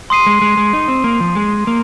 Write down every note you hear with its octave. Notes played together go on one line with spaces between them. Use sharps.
C6 D#6 C7 D#7
G#3
G#3
G#3
D#4
C4
A#3
F3
G#3
A#3